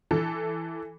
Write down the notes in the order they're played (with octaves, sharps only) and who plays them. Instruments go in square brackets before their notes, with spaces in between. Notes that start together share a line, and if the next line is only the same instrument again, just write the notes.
[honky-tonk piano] E3 A4